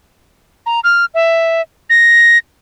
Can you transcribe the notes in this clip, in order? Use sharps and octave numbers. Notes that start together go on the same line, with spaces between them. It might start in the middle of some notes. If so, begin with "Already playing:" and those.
A#5
F6
E5
A#6